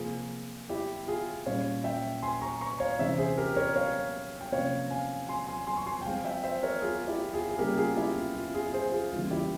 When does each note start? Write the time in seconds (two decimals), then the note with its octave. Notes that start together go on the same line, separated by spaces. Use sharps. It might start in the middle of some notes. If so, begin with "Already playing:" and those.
Already playing: C3 F3 A#3 F4 G#4
0.69 E4 G4
1.07 F4 G#4
1.46 A#2 G3 C#4 C#5 F5
1.84 E5 G5
2.23 G#5 C6
2.41 A#5 C#6
2.61 A#5 C#6
2.80 C#5 F5
2.99 C3 E3 G#3 C#4 C5 E5
3.18 G#4 C5
3.38 G4 A#4
3.56 A#4 C#5
3.76 C#5 F5
4.41 G5
4.52 C3 F3 A#3 C#4 C#5 F5
4.90 F5 G#5
5.29 G#5 C6
5.48 G#5 C6
5.67 G#5 C6
5.77 C#6
5.86 G#5 C6
6.01 G5
6.05 F3 G#3 C4 F5 G#5
6.25 E5 G5
6.43 C5 E5
6.63 A#4 C#5
6.82 F4 G#4
7.07 E4 G4
7.33 F4 G#4
7.50 G#4
7.58 C#3 G3 A#3 C#4 G4 A#4
7.77 F4 G#4
7.96 E4 G4
8.16 F4
8.35 F4
8.54 F4 G#4
8.73 G#4 C5
8.92 F4 G#4
9.12 C#3 E3 G3 A#3 F4
9.23 F4
9.30 E4 G4